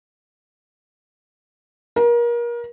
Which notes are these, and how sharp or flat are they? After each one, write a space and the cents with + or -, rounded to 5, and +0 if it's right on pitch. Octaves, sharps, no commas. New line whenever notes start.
A#4 +30